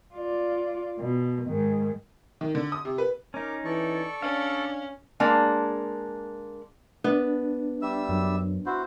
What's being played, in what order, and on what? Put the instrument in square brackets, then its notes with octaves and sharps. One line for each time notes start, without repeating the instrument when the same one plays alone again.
[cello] F4 D5
B2
G#2 D#3
[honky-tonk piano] D#3
D3
D#6
C3
B4
[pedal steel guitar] C#4 D#4 [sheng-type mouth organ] A#4 A#5 D6
[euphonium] E3 [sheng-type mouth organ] A4 D5 C#6
[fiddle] C#4 [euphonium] D4 [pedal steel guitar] F5
[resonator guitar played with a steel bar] G#3 A#3 D4
[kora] B3 [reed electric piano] D4
[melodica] G3 E5 E6
[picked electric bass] F#2
[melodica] E4 F#4 C5